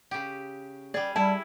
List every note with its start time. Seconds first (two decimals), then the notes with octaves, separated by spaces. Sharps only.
0.11 C#3 G4
0.94 G3 G#4 D5
1.16 G3 E4 A5